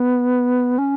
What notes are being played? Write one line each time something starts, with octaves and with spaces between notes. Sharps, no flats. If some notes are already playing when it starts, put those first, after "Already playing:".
Already playing: B3
C#4